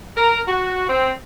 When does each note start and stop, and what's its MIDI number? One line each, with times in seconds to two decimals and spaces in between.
0.17 0.41 70
0.48 0.86 66
0.89 1.11 60